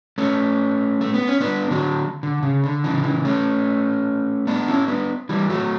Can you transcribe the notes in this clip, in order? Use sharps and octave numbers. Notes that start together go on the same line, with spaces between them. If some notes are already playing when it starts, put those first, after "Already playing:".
A3 C#4
A3
B3
C#4
B3 D4
D3 F#3
D3
C#3
D3
C#3 E3
D3
C#3 E3
A3 C#4
B3 D4
C#4 E4
B3 D4
E3 G3
F#3 A3